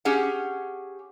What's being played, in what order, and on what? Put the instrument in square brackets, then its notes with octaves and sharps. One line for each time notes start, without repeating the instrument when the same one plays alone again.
[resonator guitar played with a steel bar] C#4 G4 G#4 F#5